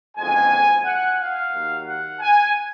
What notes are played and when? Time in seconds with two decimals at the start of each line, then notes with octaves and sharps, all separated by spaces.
0.16 F#1 F2 D3 G#3 G#5
0.85 F#5
1.19 F5
1.53 D#2 D#3 F#3
1.86 F#5
2.21 G#5